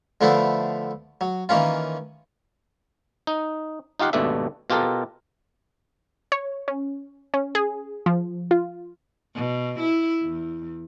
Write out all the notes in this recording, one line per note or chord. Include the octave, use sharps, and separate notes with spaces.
D3 F3 A3 B3 D4 E4
F#3
D#3 E3 A#3 C#4 F4
D#4
D#4 F4 G4 F5 F#5
G#1 D#2 B2 A3 D4 E5
B2 F4 G4 A4 A#4
C#5
C#4
C#4
G#4
F3
F4
B2
E4
E2